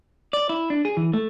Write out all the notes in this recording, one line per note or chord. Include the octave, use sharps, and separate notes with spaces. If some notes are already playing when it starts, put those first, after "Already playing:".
D5
E4
D4
G#4
E3
A3